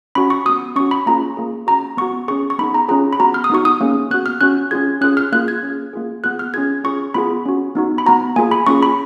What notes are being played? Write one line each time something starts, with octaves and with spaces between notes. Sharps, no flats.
C#4 F#4 B5
C#6
B3 F#4 D#6
C#4 F#4 C#6
B5
A#3 C#4 F4 G#4 A#5
A#3 F4 G#4
C#4 F#4 A#5
B3 F#4 C#6
C#4 G#4 C#6
C#6
B3 D#4 G#4 B5
A#5
C#4 F4 G#4 A#5
B5
B3 F#4 A#5
F6
D#6
B3 D#4 F#4 C#6
D#6
A#3 C#4 G#4
B3 F#4 F#6
F6
C#4 F#4 F#6
C#4 F4 G#4 G#6
C#4 F4 G#4 F#6
F6
A#3 F4 G#4 F#6
G#6
C#4 G#4
A#3 F4 G#4
B3 F4 G#4 F#6
F6
C#4 F4 G#4 G#6
C#4 F4 G#4 C#6
B3 F4 G#4 B5
C#4 F#4
B3 D#4 F#4
B5
B3 F#4 A#5
A#3 F4 G#4 G#5
B5
A#3 C#4 F4 G#4 C#6
B5